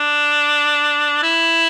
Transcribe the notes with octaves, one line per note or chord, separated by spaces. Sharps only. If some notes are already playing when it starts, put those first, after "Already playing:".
Already playing: D4
E4